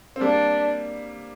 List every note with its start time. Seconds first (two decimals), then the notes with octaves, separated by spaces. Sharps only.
0.16 C4
0.21 G3 A#3 D4